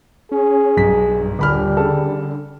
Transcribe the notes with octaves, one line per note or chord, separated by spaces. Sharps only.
C#4 G#4
B1 G2 B6
D#1 D3 G3 B5 F6
C#3 A4